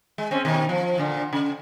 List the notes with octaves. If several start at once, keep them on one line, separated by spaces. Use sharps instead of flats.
G#3
C4 C#4
B2 D#3
F3
A#2 D3
C#3